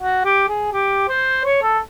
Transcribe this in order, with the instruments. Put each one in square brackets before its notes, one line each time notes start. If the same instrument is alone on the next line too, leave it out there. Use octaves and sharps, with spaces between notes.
[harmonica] F#4
G4
G#4
G4
C5
C#5
A4